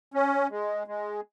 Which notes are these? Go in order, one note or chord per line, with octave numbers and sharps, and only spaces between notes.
C#4
G#3
G#3